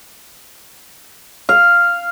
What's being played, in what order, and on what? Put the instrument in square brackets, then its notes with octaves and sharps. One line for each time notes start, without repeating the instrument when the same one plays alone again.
[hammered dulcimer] F5